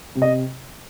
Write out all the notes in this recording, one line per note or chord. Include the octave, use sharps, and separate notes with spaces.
C3
D#5